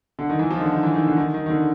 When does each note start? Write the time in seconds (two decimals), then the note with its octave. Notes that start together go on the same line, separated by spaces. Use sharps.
0.19 D3
0.29 D#3
0.39 E3
0.50 F3
0.57 D#3
0.61 D3
0.72 D#3
0.83 E3
0.94 D#3
1.06 D3
1.16 D#3
1.34 D#3
1.46 D#3
1.50 D3